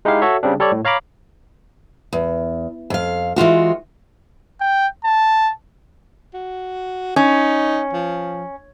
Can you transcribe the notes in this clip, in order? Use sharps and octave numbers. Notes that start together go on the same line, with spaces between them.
G#3 D#4 E4 G4 F5
F#4 A4 C#5 E5
C#3 G3 C4 D4
G3 A4 C#5 D5
A2
C#5 F5 A#5 B5 D6
E2
F2 F5
E3 G#3 F4 F#4
G5
A5
F#4
C#4 D#4
F3